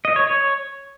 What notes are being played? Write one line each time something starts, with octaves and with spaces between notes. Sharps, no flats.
D#5
C#5
C#5